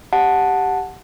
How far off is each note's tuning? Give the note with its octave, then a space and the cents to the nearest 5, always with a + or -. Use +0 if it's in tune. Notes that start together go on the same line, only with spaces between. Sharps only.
G4 +0 F#5 -5 A5 +0